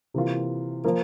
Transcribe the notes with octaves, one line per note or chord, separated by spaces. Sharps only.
C3 E3 A#3 F4
F3 A#3